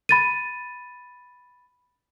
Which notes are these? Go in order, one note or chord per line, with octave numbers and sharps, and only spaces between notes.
B5 A6 D#7